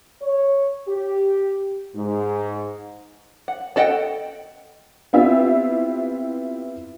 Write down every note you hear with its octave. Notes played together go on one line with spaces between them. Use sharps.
C#5
G4
G#2
F#5
D4 A4 D#5 F#5 G5
B3 C4 E4 F4 G4 E5